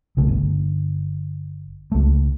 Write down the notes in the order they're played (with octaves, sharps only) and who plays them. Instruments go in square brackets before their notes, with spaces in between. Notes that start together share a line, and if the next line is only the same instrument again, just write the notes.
[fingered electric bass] C2 C#3 A3
G1
C#2 A3